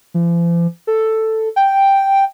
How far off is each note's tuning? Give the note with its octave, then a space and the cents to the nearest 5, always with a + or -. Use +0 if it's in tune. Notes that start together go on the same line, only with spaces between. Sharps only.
F3 -45
A4 +5
G5 +0